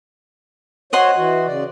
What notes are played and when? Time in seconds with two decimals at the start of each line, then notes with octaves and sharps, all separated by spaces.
0.93 F#4 C5 C#5 D#5 F#5 C6
1.16 E3 F#4
1.47 C#3 D5